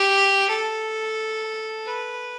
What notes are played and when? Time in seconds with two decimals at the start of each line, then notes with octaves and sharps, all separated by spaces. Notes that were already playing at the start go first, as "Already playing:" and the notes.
Already playing: G4
0.49 A4
1.86 B4